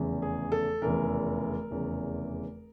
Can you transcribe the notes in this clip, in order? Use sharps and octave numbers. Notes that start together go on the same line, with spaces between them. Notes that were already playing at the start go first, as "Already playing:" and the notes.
Already playing: F1 E2 C#3 E3
G#4
A4
F1 E2 C#3 E3 A#4
F1 E2 C#3 E3